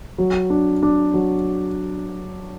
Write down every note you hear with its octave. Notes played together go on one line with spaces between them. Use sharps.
F#3
D4
D4
F#3